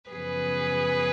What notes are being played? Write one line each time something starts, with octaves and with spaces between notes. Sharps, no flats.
F#2 C#3 F3 B3 G#4 B4